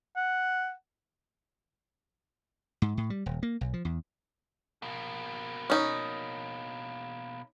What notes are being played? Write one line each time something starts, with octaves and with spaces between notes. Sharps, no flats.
F#5
G#2
A2
G3
D#1
A#3
B1
F3
E2
B2 A#3
C#4 D#4